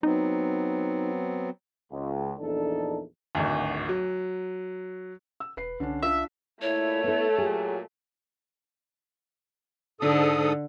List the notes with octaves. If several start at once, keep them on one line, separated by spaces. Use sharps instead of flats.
F#3 B3 C4 D#4
C#2
A#1 E2 D4 D#4 A4
D1 G#1 D2
F#3
E6
E1 B4 C7
C2 D3 C#4 D4
D4 F4 E5
A#2 A3 E4 C#5
B3 E4 A4
A#2 F#3 G4 G#4
G#2 D3 A4 D#6